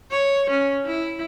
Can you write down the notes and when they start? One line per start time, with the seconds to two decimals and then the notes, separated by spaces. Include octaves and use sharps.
0.11 C#5
0.50 C#4
0.86 E4